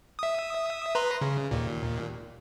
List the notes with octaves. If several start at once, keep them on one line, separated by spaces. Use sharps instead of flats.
E5 D#6
B4 A#5 C6
C#3
D#2 A#2